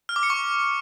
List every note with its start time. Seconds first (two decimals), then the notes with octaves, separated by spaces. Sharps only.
0.09 F6
0.16 D6
0.23 C#7
0.30 C#6